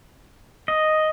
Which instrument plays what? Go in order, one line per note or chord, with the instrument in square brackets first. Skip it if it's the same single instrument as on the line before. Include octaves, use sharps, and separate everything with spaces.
[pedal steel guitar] D#5